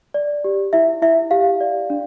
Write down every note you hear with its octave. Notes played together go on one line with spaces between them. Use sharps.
D5
G4
E4 E5
E4 E5
G4 F5
D5
D4